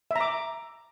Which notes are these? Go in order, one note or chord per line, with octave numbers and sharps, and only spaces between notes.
E5
A#5
D6